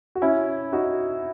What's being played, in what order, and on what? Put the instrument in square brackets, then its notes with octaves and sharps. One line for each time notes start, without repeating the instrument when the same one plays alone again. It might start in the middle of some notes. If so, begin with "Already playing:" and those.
[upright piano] F#4
C#4 E4
D#4 F#4